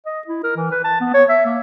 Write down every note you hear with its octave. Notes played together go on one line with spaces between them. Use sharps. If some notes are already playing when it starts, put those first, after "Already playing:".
D#5
E4
A#4
E3
B4
A5
B3
C#5
E5
A#3